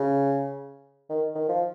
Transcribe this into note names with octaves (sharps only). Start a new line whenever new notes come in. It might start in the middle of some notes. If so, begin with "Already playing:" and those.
Already playing: C#3
D#3
D#3
F3